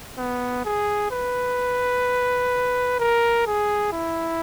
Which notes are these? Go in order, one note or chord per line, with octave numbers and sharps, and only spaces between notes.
B3
G#4
B4
A#4
G#4
E4